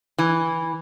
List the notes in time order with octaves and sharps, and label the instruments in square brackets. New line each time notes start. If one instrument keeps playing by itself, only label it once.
[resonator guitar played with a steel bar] E3